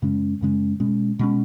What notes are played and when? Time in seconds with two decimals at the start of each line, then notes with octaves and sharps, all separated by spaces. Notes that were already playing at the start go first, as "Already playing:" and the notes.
0.02 F#2 C#3 G#3 C#4
0.41 F#2 C#3 G#3 C#4
0.80 B2 G#3 C#4
1.19 B2 G#3 C#4